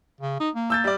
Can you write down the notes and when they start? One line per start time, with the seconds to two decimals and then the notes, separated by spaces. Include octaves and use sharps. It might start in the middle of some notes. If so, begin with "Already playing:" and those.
0.21 C#3
0.40 D#4
0.55 A#3
0.70 E6 G6 A6
0.84 G3 D5